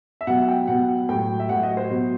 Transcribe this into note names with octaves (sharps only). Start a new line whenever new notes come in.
E5
B2 F#3 F#5
G5
B2 F#3 F#5
A2 F#3 G5
E5
A2 F#3 F#5
D#5
C5
B2 F#3